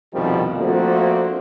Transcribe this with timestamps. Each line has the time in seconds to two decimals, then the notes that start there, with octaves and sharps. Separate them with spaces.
0.13 C2 F2 B2 D#3 F3 G3
0.57 F3 A3 A#3 C4 D4 F#4